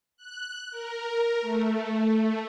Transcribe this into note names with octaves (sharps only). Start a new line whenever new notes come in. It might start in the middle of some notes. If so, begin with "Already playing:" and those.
F#6
A#4
A3